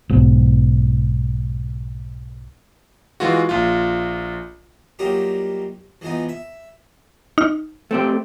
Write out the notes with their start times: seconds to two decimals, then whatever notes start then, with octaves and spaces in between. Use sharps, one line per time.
0.09 B1 G#2
3.20 E3 G#3 F4 F#4
3.49 A#1 F4
4.99 F#3 G3 A#3 D#4 F4 G4
6.01 E3 F3 G#3 B3 D#4
6.29 E5
7.38 D#4 F6
7.91 A3 C4 G4